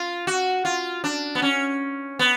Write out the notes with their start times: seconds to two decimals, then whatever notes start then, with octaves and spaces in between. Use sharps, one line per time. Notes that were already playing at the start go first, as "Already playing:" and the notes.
Already playing: F4
0.27 F#4
0.65 F4
1.04 D4
1.35 B3
1.42 C#4
2.19 B3